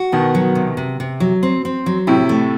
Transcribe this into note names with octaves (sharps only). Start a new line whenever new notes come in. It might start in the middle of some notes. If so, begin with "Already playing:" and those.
Already playing: F#4
B2 D#3 B3
F#3
C3
C3
C3
F#3
C4
C4
F#3
A2 C3 E4
A3